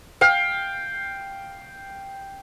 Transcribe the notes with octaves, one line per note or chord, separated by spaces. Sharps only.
F5 G5